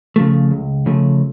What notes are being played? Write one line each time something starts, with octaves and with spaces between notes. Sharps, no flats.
C#3 F3 A3
C#2
C#3 F3 A3